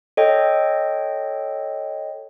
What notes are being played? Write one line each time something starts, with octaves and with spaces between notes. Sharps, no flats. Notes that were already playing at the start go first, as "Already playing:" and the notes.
A4 C#5 D#5 G5